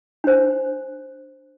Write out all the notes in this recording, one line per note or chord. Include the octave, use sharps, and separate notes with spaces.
D4 C5